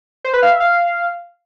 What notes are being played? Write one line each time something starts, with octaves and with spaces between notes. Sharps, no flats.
C5
B4
F5
E5
F5